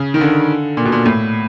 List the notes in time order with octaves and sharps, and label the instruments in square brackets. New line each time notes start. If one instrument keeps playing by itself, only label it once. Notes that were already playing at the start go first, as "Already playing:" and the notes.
Already playing: [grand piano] C#3
D#3
D3
A#2
B2
A#2
A2